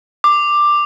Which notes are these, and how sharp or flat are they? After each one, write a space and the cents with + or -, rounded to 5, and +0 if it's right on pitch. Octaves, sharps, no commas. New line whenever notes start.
D6 +10